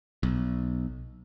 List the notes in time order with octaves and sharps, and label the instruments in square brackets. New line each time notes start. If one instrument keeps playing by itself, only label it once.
[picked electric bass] B1